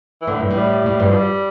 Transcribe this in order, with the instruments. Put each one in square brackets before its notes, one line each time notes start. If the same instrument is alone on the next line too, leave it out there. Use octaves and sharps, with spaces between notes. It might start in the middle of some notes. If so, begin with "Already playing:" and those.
[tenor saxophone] E3
[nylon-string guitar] A2 [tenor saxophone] D3
[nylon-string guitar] G2 [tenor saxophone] E3
[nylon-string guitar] A2
[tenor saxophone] G3
[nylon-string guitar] A2
G2
[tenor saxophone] F3
G3